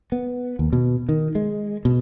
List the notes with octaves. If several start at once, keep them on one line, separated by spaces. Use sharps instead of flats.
B3
D#2
B2
D#3
G#3
B2